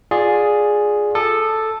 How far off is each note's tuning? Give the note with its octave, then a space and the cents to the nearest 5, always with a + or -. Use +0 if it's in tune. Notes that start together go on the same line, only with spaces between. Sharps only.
F4 +25 G#4 +0 D5 +0
A4 +0 D#6 -35